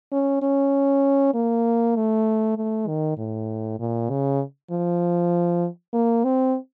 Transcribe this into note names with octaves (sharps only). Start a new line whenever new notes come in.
C#4
C#4
A#3
A3
A3
D#3
A2
A#2
C#3
F3
A#3
C4